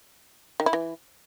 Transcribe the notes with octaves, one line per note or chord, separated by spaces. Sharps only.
D#3
E4
E3